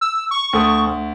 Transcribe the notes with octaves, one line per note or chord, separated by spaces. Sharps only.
E6
C#6
D2 A4 D#6
D2